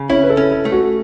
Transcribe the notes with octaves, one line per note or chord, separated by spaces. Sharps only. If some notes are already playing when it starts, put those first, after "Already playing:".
Already playing: C#3
C#4 E4
B4
A4
C#4
A4
A3
F#4